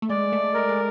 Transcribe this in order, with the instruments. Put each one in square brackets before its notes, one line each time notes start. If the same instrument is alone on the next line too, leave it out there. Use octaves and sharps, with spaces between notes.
[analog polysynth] A3
[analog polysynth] G#3 [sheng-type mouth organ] D5
[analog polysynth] A3
[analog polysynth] G#3 [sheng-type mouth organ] A#4
[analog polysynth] G#3